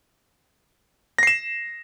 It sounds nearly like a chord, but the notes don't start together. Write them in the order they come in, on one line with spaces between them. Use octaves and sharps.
A#6 C7 E7